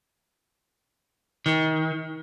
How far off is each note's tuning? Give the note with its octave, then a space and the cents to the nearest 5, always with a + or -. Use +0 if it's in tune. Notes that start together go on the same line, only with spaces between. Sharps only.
D#3 +30